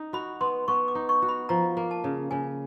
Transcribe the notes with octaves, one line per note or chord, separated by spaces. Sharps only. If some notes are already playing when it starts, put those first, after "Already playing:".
Already playing: D#4
F#4 B5
B3 C6
B3 C#6
D6
D#4
C#6
F#4
B5
F3 A#5
A#3
A5
C#3
C#3 G#5